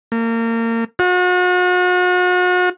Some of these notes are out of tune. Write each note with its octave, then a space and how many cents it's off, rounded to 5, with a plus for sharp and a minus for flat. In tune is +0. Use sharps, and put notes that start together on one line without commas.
A#3 -30
F#4 -40